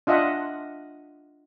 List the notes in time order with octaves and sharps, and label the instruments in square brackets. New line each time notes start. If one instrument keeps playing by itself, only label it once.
[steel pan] D4 F4 D#5 E5 F#5